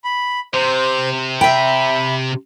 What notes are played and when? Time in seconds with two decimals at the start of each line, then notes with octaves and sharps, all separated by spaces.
0.04 B5
0.54 C3 C5
1.41 E5 G5 B5